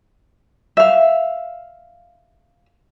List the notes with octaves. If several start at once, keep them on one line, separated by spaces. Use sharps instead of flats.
E5 F5